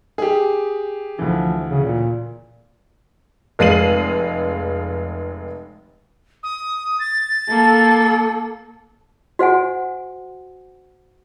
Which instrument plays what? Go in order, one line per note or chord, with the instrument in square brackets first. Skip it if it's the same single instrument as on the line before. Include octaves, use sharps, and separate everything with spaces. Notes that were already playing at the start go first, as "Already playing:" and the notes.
[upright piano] G4 G#4
[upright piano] D2 E3 [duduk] F3
[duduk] C#3
A#2
[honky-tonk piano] F1 G#3 F5 C7 D#7 F#7
[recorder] D#6
A6
[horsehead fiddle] A#3 A4
[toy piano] F#4 C5 F#5 G#5